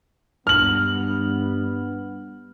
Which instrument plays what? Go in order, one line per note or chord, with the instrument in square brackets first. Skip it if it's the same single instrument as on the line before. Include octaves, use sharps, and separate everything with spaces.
[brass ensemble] G2 B3 [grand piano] F6 F#7